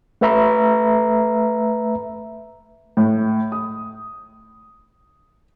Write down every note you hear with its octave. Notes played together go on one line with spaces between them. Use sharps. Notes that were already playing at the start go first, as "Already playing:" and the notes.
A3 B4 E5 A#5 B5
A2
D#6